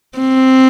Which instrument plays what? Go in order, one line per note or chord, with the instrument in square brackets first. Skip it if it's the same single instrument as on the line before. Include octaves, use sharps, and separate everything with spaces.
[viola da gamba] C4